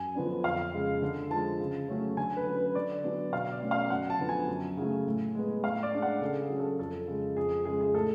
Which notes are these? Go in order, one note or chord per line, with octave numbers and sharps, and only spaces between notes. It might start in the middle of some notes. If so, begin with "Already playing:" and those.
Already playing: F#2 G#5
D3 F3 B3 D4
F2 F5
C#3 G#3
D3
F3 G#3 A5
C#3
F#3 A3 C#4
D3 G#5
B4
F#3 C#4
B4
D3 D5
F#3 B3 D4
B2 F5
D5
A3 C#4
F5
F#2 F#5
A5
D3 F3 B3 D4
G#5
F#2
C#3 F#3 A3
A2
G#3 B3
A2 F5
D5
G#3 D4
F#5
C#3 A4
G#4
F#3 C#4
A4
F2 A4
C#3 G#3
F2 G#4
C#3 G#3 G#4
G#4
A2 A4